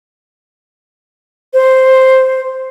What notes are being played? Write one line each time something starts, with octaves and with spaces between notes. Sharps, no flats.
C5